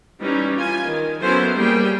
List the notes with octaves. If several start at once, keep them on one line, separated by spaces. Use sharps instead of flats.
E3 G3 C#4 D#4
F4 G#5
D#3
F#3 B3 C#4 E4 A4 C5
G3 A#3 G#4 G5